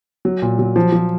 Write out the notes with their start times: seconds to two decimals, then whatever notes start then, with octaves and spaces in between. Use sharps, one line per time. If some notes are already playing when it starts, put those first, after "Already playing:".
0.25 F#3
0.42 A#2
0.59 F#3
0.76 F3
0.92 F3